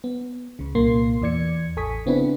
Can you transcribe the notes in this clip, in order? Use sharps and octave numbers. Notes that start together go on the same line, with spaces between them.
B3
C#2 C#3
C2 A#2 A#3 C6 C7
E2 E3 D5 G#6 C#7
A1 A4 G#5 C#6 D#6 B6
C#3 B3 C4 D4 E4 B4